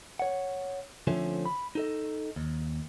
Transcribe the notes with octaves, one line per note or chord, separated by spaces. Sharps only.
C#5 F#5
D3 F3 A3 C4 C#4
B5
D#4 A4 D#5
D#2